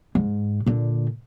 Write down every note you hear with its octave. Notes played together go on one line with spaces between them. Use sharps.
G#2
A#2 D3